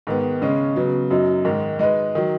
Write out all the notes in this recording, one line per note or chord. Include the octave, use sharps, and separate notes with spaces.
G#2 D#3 B3
C#3 G#3 C#4
C#3 F#3 B3
F#2 F#3 D#4
G#2 D#3 G#3
G#3 D#4 B4
D#3 F#3